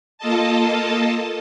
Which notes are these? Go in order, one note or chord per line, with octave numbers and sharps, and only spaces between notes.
A#3 F4 A4 D#5 A5